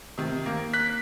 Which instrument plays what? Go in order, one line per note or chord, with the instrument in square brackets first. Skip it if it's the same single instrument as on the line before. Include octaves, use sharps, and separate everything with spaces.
[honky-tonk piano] C3 D#3
A#3
[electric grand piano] F#6 B6